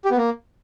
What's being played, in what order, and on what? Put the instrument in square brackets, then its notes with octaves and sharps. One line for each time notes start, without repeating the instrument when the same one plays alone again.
[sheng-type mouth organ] G4
B3
A#3